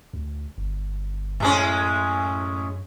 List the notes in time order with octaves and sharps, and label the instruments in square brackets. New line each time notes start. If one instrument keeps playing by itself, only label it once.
[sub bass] D2
G1
[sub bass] F#2 [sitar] A2 G#3 C#4